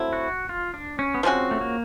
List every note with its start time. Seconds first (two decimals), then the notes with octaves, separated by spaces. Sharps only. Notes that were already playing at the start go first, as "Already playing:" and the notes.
Already playing: F#3 A3 C4 E4
0.13 F#4
0.49 F4
0.74 D4
0.99 C#4
1.14 B3
1.23 F3 G#3 C4 C#4 F#4
1.51 A3
1.61 A#3